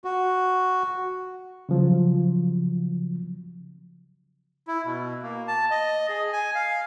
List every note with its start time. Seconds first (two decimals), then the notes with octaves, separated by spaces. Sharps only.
0.05 F#4
1.69 C#3 F3 F#3
4.68 E4
4.85 B2
5.22 A#3
5.48 A5
5.71 D#5
6.09 G#4
6.33 G#5
6.55 F5